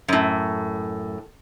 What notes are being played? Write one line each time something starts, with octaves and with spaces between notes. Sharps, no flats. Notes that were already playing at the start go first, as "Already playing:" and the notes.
F#2 A2